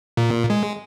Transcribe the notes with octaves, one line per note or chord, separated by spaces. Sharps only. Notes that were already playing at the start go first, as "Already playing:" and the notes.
A#2
G#3